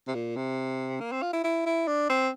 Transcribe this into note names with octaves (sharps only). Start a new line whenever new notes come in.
C3
A#2
C3
A#3
C4
F4
E4
E4
E4
D4
C4